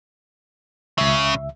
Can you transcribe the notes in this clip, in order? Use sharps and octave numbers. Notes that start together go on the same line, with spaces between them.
C#2 C#3 E5